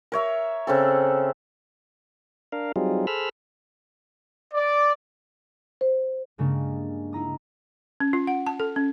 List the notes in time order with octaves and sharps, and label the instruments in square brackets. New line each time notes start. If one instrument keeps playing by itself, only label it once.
[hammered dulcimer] A#4 C#5 E5
C#3 C4 A4
[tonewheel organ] D4 A#4 F5
F#3 G3 C4 D#4 F4 G#4
G#4 A4 C5 B5 E6 F6
[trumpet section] D5
[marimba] C5
[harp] G2 C#3 G#3 A#3 D4 G4
D#4 E4 A#5 D#6
[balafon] C#4
F4
F#5
A5
A4
C#4